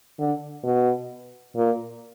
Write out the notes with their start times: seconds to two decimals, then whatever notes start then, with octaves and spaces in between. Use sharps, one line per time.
0.19 D3
0.63 B2
1.56 A#2